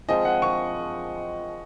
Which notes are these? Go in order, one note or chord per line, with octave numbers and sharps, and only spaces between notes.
F3 G#3 C4 F4 D#5
F#5
C#6